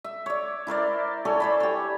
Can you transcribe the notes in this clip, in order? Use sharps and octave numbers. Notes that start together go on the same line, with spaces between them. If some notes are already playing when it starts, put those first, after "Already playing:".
E5
C#5 D5
E4 A#4 C5 D5
A4 C#5 D5 G#5
C5 D5 B5
G4 C#5